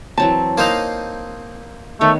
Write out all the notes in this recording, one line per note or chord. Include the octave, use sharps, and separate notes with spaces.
E3 F#3 C4 A5
A#3 C4 D#4 C5 D#5 F5
D#3 A3 B3 C#5